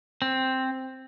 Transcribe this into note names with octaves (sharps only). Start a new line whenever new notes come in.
C4